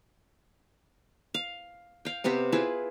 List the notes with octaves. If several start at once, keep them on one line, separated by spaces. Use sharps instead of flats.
F5
F5 G5
C3 B3 C4 G4
E4 F4 G#4 B4